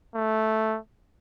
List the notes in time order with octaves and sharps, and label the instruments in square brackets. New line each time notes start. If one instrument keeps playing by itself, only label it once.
[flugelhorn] A3